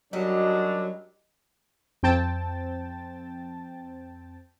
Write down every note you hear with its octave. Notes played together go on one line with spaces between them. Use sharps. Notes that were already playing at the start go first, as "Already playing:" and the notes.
F#2 F#3 G3 D4 D#5
F2 C4 G5 A5 A6